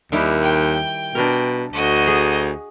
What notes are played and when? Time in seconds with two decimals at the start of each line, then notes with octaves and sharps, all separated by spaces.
0.12 D#2 D#3 G3 E4
0.42 G5
1.15 B2 D4 A#4
1.73 D2 F#4 D#5
2.07 G#4